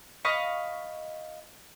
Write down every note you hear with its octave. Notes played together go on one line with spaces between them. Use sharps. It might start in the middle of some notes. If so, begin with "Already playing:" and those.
D#5 F5 B5 C#6